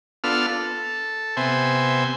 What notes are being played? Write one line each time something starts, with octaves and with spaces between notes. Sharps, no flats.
B3 D4 F4 A4 E6 F6
A4
C3 B3 C5 E5 G#5